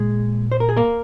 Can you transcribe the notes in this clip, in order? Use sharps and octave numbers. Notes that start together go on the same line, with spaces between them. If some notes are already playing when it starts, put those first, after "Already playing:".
Already playing: A#2 G#3 G#4
C5
A#4
G#4
A#3 A#4